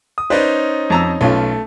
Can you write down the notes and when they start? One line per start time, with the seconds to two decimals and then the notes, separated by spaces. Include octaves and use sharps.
0.18 D#6
0.30 C#4 D#4 B4 C5 D5
0.90 F2 A#5 E6
1.21 B1 A3 C#4 F4